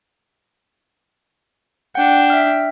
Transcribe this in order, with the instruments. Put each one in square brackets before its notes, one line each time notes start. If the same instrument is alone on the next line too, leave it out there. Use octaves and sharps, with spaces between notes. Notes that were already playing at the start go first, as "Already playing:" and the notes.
[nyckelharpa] D4 G5 [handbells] F#5
[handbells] E5 F6